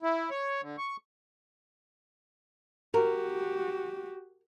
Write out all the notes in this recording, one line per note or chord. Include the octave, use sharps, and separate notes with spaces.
E4
C#5
D3
C#6
F#4 G4 A#4